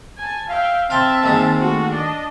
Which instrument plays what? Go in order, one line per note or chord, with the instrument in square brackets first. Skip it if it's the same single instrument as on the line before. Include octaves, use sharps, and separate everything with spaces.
[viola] G#5 A5
[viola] E5 G5 [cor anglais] F5
[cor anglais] C4 [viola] E5 A5 [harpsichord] F5 G5 C6
[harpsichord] D#3 G#3 A#3
[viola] A3 F#4
D4 D#5